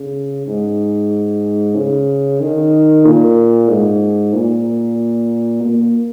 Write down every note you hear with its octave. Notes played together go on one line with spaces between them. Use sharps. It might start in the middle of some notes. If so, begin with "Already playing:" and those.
Already playing: C#3
G#2
C#3
D#3
A#2
G#2
A#2
A#3